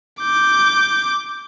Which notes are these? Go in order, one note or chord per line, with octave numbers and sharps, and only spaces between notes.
D6 G6